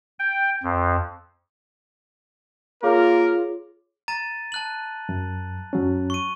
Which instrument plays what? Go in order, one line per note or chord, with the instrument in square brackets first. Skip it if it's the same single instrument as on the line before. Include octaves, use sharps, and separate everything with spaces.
[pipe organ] G5
F2
[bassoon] A#3 [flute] F4 [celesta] G#4 C#5 D6 [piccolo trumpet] A#4
[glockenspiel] A#5 A6 D#7
A5 F#6 F#7
[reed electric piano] F#2
F#2 F#3 C#4
[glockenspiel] C#6 D#7